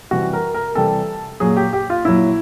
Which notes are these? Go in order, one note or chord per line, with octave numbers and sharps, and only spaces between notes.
C3 E3 G3 F#4
A#4
A#4
C3 E3 G3 A4
A#2 F#3 G#4
G4
G4
F4
A#2 F#3 E4